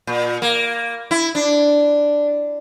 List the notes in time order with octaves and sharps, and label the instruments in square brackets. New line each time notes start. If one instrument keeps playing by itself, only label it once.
[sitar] A#2
A#3
E4
D4